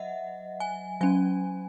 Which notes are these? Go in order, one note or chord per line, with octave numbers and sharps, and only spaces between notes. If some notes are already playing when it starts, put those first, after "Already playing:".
Already playing: F#3 D#5 E5 F#5
G#5
F#3 C#4 G#5